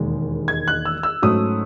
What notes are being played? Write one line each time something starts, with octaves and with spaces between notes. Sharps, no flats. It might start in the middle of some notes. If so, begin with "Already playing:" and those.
Already playing: E1 D#2 D#3 G#3
G#6
F#6
E6
E6
G#2 F#3 A3 C#4 D#6